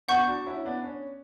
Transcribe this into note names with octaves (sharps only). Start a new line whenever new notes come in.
B3 D4 F#5 C#6 G6
D4 F#4
C#4 E4
B3 D4
C#4